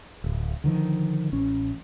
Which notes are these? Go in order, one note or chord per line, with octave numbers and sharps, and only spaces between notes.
D1
D3 D#3 F3
A1 C#4